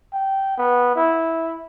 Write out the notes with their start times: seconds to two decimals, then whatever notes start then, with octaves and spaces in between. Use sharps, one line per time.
0.13 G5
0.58 B3
0.96 E4